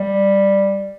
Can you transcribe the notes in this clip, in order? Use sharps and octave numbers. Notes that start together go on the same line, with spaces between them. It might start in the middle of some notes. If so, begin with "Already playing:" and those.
Already playing: G3